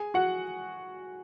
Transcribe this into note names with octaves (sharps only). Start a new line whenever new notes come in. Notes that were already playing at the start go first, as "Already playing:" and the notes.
Already playing: G#4 G#5
F#4 F#5